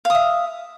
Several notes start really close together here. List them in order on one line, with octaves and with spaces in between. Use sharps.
F5 D#6 E5